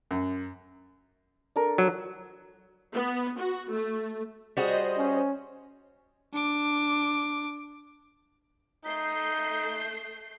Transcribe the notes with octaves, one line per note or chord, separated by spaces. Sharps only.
F#2
D4 A4 A#4
F#3
B3
F#4
A3
G3 F#4 G#4 C5 D#5
C#4
D4 D6
A3 D#4 G6 C7